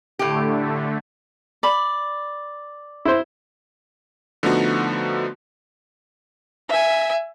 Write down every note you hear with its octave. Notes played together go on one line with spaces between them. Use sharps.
A2 D3 A3 G4
D5 B5
E4 C5
D3 F3 A3 B3 D#4 F#4
E5 G#5